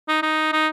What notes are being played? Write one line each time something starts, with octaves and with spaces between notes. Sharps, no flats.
D#4
D#4
D#4